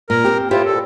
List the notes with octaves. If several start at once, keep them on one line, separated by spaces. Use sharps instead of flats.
A#2 A#4
C4 G4
A2 E4 F4 G4 C5 C#5
A#2 A4